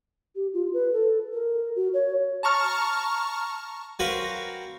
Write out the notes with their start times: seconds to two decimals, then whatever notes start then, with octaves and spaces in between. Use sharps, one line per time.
0.36 G4
0.54 F4
0.74 B4
0.93 A4
1.33 A#4
1.76 F#4
1.94 C#5
2.43 A5 A#5 C#6 F6
3.99 F#3 C4 F#4 A#4 B4 F5